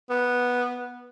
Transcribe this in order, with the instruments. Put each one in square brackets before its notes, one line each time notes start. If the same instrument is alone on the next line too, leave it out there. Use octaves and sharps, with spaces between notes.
[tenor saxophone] B3